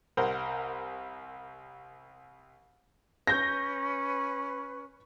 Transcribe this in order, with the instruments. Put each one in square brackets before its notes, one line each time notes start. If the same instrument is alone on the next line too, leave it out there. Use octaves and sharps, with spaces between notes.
[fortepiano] C2 A#4 C5 F#5 A#5
[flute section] C#4 B4 [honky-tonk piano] G6 A#6